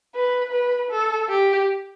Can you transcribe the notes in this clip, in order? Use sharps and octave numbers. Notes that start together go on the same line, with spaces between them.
B4
B4
A4
G4